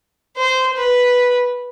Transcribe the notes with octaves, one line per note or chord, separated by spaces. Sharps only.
C5
B4